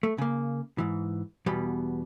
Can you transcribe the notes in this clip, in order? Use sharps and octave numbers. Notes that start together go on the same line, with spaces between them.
A3
C#3 A#3
G#2 E3
E2 B2 G3 B3